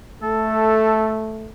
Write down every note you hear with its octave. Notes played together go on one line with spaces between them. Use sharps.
A3 A4